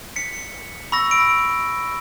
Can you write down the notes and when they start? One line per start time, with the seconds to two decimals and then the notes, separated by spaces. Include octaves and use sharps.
0.16 B6 C#7
0.92 B5 C#6 E6 A#6
1.11 E6 D7